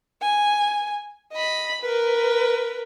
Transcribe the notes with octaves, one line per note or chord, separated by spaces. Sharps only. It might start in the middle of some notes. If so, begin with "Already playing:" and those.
G#5
D#5 B5
A#4 B4